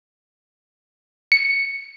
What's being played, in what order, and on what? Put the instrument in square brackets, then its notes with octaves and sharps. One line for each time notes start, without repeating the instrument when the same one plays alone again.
[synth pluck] C#7